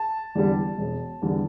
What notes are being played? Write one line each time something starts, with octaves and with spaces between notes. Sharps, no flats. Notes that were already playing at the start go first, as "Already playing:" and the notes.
Already playing: A5
E2 D3 G3
E1
E2 D3 G3